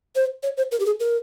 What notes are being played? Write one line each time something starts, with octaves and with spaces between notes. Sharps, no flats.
C5
C#5
C5
A#4
G4
G#4
A#4